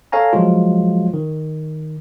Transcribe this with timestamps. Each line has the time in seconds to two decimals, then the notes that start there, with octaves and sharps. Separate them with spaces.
0.12 A4 C#5 F5 G#5 A#5
0.33 F3 F#3 G#3 F4
1.14 D#3